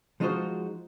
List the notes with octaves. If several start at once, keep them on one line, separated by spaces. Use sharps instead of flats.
F3 G#3 D#4 F4 F#4 C5